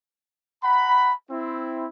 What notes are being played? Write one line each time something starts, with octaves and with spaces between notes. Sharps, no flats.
F#5 A#5 B5
C4 E4